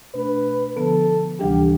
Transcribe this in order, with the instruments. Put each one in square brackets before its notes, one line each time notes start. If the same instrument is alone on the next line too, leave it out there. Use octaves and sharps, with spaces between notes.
[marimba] B2 A3 D4 [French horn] B4
[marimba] D3 F3 B3 [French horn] A4
[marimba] D2 C3 E3 G3 D4 [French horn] G4